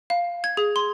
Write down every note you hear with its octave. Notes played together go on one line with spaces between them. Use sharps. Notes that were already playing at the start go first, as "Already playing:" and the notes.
F5
G#6
G#4
C6